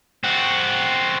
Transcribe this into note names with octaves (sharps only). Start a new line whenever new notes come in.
C4 F#4